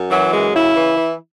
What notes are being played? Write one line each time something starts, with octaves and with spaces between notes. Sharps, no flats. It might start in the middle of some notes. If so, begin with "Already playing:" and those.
Already playing: F#2
E3 F#3
F#2 G#3
C#3 E4
E3
E3